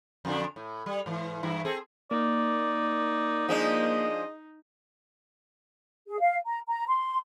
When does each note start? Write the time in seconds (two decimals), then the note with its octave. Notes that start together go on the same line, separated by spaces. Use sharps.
0.25 F2 D3 D4
0.56 A2
0.86 G3
1.06 G#2 E3
1.43 G2 E3 E4
1.65 C4 G#4 A4
2.11 A#3 D#4 D5
3.49 F3 G#3 D4 D#5
6.07 G#4
6.20 F5
6.46 A#5
6.67 A#5
6.88 C6